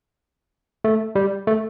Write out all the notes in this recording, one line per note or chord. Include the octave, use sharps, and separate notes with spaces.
A3
G3
A3